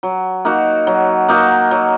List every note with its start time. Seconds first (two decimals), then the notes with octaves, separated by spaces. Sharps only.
0.03 F#3
0.45 A#3 D#4 F#4
0.87 F#3
1.28 A#3 D#4 F#4
1.71 F#3